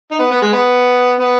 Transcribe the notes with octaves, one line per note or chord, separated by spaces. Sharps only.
D#4
B3
B3
G#3
B3
B3